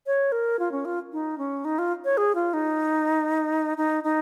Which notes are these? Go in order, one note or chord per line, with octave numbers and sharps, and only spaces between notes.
C#5
A#4
F4
C#4
F4
D#4
C#4
D#4
F4
C#5
G#4
F4
D#4
D#4
D#4